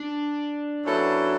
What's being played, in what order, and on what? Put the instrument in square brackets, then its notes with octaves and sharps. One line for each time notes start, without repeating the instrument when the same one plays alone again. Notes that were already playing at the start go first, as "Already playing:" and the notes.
Already playing: [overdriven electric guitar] D4
[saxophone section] F#2 F#3 B3 E4 A4